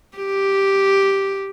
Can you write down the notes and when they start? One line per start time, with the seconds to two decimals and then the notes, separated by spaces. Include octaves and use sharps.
0.17 G4